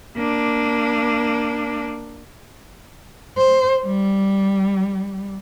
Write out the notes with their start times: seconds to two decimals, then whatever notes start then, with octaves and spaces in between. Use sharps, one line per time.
0.16 A#3 D4
3.38 C5
3.86 G3